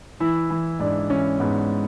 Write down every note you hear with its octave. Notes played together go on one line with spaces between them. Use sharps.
E3 E4
E3
G#2 D4
E3 C#4
G#2 B3